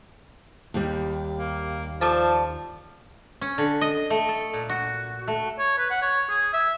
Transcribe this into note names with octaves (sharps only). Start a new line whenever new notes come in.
D#2 G3
A#3
F3 A4 D5 A5
C#4
D3
D#5
A3
A4
A#2
F#4
A3
C#5
B4
F#5
C#5
G#4
E5